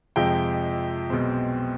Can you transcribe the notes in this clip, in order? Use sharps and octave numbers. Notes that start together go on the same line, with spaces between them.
F2 C3 F3 G#3 G5
B1 B2 G#3 C4